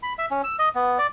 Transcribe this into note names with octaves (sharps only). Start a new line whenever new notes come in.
B5
E5
C#4
E6
D#5
B3
D5